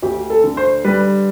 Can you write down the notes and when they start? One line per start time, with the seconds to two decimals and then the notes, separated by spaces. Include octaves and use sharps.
0.02 D2 G4
0.30 A4
0.44 D3
0.57 C5
0.84 G3 B4